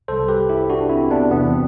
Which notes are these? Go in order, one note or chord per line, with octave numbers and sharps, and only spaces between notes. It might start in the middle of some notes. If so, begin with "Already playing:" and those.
C2 C3 G3 A4 C5
G4 B4
E4 G4
D4 F#4
C4 E4
B3 D4
E2 C3 E3 B3
C4